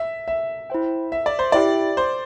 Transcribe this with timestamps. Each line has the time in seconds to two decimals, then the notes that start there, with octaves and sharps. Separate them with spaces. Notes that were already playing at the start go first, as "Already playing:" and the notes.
Already playing: E5
0.28 E5
0.70 E4 C5 G5
1.12 E5
1.26 D5
1.39 C5
1.52 E4 G4 D5 E5 G5
1.97 C5